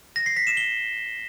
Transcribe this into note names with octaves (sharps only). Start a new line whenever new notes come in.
A#6
C7
B6
E7
G7